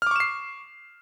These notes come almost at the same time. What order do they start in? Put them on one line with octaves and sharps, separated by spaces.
F6 D6 C#6 E7 C7